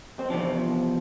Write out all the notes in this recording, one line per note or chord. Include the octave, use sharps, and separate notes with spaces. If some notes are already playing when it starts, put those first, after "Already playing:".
C4
E2 C3 F3 D4